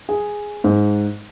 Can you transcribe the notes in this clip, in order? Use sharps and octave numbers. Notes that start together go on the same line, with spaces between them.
G#4
G#2